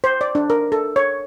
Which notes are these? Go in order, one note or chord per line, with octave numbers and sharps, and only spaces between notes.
C5
D5
D4
A#4
A4
C#5